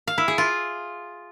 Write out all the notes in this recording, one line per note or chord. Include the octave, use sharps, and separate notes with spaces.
F5
E4
G#4
F4